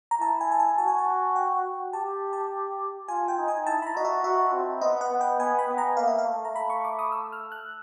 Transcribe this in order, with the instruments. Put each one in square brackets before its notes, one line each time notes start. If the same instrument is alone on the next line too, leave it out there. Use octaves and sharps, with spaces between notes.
[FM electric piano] A#5
[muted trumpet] E4 [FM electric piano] A5
[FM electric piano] G#5
A5
G#5
[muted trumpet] F#4 [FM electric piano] A5
[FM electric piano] G#5
A5
G5
[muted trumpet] G4 [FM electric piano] A5
[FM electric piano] A5
[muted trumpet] F4 [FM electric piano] G#5
[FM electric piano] G5
[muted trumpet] D#4
[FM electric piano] G#5
[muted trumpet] E4 [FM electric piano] A5
[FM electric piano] B5
A#5
[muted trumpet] F#4 [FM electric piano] D#5
[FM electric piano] E5
[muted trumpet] F#4 [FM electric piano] E5
[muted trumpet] C4
[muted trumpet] B3 [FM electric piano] D#5
[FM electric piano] F#5
[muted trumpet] B3
[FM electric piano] G5
[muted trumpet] B3 [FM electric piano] G#5
[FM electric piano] B5
[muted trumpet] B3
[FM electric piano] A#5
[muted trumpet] A#3 [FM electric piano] F5
[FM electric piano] E5
F5
[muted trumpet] A3
[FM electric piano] A#5
[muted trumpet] A3 [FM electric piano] B5
[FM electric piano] C#6
D6
D#6
E6
F6
F#6